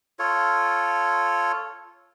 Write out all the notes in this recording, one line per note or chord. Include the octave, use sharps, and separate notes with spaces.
F4 A4 C#5